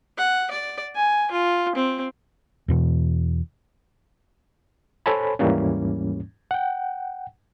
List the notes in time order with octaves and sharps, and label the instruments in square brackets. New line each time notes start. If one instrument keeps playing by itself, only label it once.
[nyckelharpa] F#5
D5
G#5
F4
C4
[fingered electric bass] E2 B2 E3
[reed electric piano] A4 C5 C#5 G#5 A5 B5
D#2 G#2 E3 G3 A#3 C#4
F#5 G5